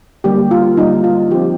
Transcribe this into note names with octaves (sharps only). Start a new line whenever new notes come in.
D3 G3 A#3 G4
F4
D3 G3 A#3 D#4
F4
F3 C4 G4